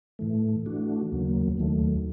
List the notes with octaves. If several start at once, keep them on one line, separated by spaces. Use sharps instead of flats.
A2 E3 A3
E3 A3 D4 F#4
D#2 C#3 F#3 A#3
D#2 D#3 F#3 A3